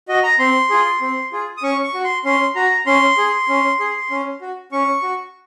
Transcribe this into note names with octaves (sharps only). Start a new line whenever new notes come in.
F#4 D#5
A#5
C4 C6
F4 G#4
C4
F4 G#4
D#6
C#4 C#6
C#6
F#4
C6
C#4 C6
F#4 A#5
C#4 C6
G#4
C#4
G#4
C#4
F#4
C#4 C#6
F#4